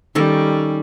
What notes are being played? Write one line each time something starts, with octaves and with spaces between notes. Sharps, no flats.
D#3 G3 C#4 A4